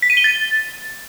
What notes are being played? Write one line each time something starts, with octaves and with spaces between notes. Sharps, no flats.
B6
D#7
G7
A6